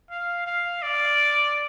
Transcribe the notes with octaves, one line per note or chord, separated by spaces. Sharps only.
F5
F5
D5